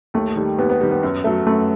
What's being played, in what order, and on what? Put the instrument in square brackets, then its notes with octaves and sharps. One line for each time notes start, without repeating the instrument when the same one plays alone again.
[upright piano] D#2 [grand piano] A3
[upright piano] D#3 G3
[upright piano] D#2 [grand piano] B3
[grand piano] B3
[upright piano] D#3 G3
[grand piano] B3
[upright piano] F#2
F#3 A3
[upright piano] F#2 [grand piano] A3